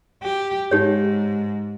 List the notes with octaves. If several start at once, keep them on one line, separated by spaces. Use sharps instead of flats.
G4
G#2 D#4 G4 C#5